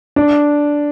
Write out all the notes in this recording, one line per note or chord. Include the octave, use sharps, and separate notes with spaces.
D4